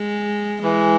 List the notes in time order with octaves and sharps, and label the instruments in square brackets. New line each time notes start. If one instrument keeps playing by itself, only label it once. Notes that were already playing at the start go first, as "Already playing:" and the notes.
Already playing: [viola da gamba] G#3
[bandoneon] E3 [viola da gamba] G#3